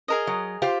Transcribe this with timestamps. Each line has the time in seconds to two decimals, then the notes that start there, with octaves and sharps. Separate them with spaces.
0.08 G#4 A#4 D#5
0.27 F#3
0.62 F4 G4 C5